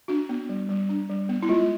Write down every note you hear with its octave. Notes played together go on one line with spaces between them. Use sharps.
D4 F#4
B3
G3
G3
D4
G3
B3
E4
G#3 F4